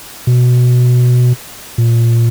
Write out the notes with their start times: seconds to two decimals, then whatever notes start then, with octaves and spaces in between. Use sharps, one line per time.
0.27 B2
1.78 A#2